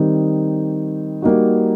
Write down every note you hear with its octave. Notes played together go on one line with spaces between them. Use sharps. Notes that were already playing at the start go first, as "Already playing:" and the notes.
Already playing: D#3 G3 C4 D#4
G3 A#3 D#4 F#4